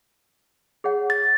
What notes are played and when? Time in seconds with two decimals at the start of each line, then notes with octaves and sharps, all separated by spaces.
0.84 G#4 C#5 F#5
1.10 A6